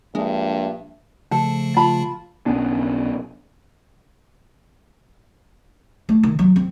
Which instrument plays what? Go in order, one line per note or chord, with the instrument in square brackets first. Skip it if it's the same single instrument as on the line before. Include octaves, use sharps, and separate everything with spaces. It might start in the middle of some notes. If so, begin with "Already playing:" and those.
[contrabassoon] A#1 [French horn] G2 [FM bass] G#3 [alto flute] E5
[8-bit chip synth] C#3 F3 A3 [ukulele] A4
[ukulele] F4 A5 B5
[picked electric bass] B1 B3 C#4 D4
[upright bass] A3
D#3
F#3
C4